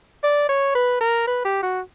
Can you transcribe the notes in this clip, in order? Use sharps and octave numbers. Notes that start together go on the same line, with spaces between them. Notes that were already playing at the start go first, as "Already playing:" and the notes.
D5
C#5
B4
A#4
B4
G4
F#4